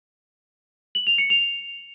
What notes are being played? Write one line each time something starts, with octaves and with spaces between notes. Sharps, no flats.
F#7
F7
C#7
F7